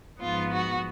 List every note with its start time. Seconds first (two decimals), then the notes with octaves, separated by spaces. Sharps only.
0.20 G#2 F3 B3 F4
0.52 F#4